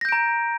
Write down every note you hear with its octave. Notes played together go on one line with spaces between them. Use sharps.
A#5 G6 A#6 D7